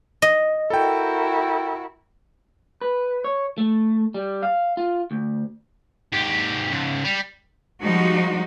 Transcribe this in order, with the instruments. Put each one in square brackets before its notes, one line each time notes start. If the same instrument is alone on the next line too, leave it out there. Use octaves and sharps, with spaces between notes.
[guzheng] D#5
[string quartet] E4 F#4 A#4 [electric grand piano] A4 G5
[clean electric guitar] B4
C#5
A3
G3
F5
F4
D2
[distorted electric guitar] G#2 G4
C#2 G#2
G3
[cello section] F3 G3 G#3 D#4 F#4